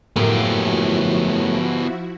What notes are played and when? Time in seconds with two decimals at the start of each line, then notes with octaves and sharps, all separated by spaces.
0.16 F#2 A2 F3 A#3 B3 E4 F#4 G4